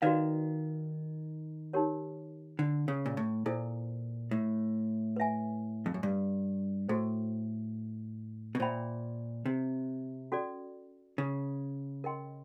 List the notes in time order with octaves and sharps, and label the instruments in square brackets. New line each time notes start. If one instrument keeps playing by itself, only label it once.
[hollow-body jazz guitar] D#3 [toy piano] F#4 B4 D5 F5
[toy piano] D#4 G4 A#4 C#5
[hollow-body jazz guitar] D3
C#3
A#2
A2
[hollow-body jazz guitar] A#2 [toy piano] E4 A4 C5
[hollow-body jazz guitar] A2
[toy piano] B4 E5 G#5
[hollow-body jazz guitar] F2
F#2
G2
[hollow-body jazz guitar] A2 [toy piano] F#4 A4 C5
[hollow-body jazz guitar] B2
[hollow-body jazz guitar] A#2 [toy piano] C5 E5 G5 B5
[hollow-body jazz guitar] C3
[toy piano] C#4 F#4 A4 D5
[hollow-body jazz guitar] C#3
[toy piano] A#4 D#5 G5 C6